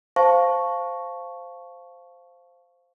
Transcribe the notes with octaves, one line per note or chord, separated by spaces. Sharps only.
C5 F5 A5 C#6